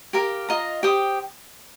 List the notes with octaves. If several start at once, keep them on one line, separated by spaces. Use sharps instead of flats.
G4 A#4 F5
F4 D#5 A#5
G4 C5 G5 D#6